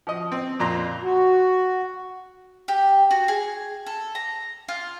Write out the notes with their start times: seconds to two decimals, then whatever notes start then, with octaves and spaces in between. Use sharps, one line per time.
0.07 F3 D#5
0.32 C4
0.59 F2 A#2 A#5 C6
1.02 F#4
2.68 G4
3.11 F#4
3.28 G#4
3.86 A4
4.15 A#5
4.68 F4